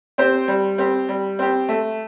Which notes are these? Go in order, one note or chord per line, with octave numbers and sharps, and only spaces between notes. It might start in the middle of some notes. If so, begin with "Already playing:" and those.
C4 G4 C5
G3
C4 G4
G3
C4 G4
A3